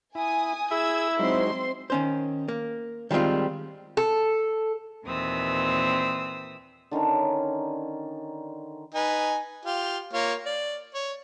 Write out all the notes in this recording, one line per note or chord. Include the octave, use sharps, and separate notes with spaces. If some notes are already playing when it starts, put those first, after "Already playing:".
E4 G#5 D#6
E4 G#4 E6 G#6
F#3 G#3 C4 D#4 C6
D#3 C#4 C5
A#3
D#3 G3 G#3 C4 F4
A4
D#2 A#2 E3 C4 D#6 E6
D3 D#3 C#4 A#5
D#4 B4 G#5
F4 G4
A#3 F4 C#5
D5
C#5